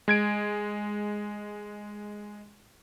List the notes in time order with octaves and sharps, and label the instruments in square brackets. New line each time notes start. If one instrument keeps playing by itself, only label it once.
[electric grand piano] G#3 G#6 D7